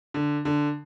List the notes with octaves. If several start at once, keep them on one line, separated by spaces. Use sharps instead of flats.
D3
D3